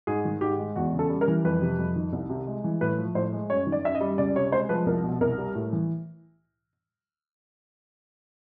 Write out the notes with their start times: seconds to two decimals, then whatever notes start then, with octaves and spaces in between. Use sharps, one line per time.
0.07 G#2 G#4
0.25 D#3
0.41 G#2 G4
0.59 G#3
0.76 E2 F#4
0.93 C#3
0.99 A4
1.10 G3
1.21 A#4
1.28 E3
1.44 F2 B4
1.62 C3
1.79 F2
1.96 D#3
2.13 C2
2.29 C3
2.47 G#3
2.64 E3
2.81 A2 B4
2.98 F3
3.15 A2 C5
3.33 G#3
3.50 F#2 C#5
3.67 D#3
3.72 D5
3.84 F#2 E5
3.95 D#5
4.01 G3
4.18 C#2 D5
4.36 C3 C#5
4.52 G#3 C5
4.69 F3 B4
4.86 C2 A#4
5.04 B2
5.21 C2 A#4
5.38 G3
5.55 A2
5.73 E3